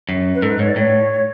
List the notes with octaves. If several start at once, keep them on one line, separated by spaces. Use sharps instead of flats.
F#2
B4
G#2 A4
B4
G#2 C#5
D5
A2 C#5